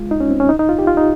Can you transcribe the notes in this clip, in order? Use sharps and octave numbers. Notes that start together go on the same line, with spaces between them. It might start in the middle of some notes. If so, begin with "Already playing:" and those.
Already playing: G#3 F4
D#4
C#4
C4
C#4
D#4
D#4
F4
G4
F4
D#4